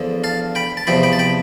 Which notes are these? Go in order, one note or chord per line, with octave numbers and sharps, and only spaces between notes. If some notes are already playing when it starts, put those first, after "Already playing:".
Already playing: E2 D3 F3
F5 A5
G5 B5
A5
E2 C3 F3 G5 B5
G5 B5
A5
G5 B5